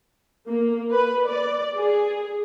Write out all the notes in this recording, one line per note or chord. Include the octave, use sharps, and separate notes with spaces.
A#3
B4
D5
G#4